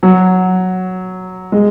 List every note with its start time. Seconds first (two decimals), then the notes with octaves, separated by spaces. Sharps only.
0.03 F#3
1.52 G#3